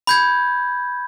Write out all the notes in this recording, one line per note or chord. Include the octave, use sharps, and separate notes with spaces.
B5 G6 G#6